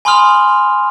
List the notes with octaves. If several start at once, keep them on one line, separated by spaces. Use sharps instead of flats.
G#5 B5 C6 D#6 F6 F7